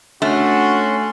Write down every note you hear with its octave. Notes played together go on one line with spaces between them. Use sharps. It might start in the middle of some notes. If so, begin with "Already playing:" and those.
A3 C#4 D4 F#4 C6